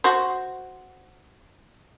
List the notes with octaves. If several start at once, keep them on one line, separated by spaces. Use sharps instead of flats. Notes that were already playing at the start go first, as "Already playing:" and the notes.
F#4 C5